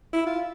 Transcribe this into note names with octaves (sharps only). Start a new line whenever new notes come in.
E4
F4